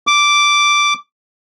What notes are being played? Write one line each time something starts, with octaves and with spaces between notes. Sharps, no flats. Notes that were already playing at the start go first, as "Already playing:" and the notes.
D6